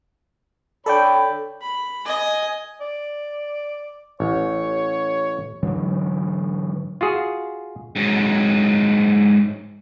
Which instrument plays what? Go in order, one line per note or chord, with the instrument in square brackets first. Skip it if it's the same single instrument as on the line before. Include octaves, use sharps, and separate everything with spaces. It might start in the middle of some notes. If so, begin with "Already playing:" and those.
[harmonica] D3 C#5 B5 [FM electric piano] A4 D5 G5
[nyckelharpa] B5
D#5 G#5
[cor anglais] D5
[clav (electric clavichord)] A1 [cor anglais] C#5
[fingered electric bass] G#2 D3 E3 F#3
[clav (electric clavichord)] F4 F#4 G#4
[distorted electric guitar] G#2 F#3